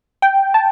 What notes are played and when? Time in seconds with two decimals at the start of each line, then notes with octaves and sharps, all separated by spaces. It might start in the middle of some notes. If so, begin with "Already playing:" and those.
0.22 G5
0.54 A5